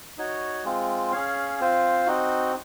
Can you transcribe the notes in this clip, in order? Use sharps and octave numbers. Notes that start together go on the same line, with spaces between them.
D#4 F#4 C#5
G#3 C4 F4
C#4 G#4 C#5 F5
C4 F4 C5 F5
C4 D#4 F#4